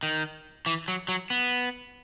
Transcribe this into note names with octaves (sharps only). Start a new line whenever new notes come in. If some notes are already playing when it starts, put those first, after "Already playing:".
D#3
E3
F#3
F#3
B3